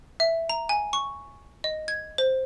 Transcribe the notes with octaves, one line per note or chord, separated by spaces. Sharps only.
E5
A#5
G#5
C#6
D#5
G#6
C5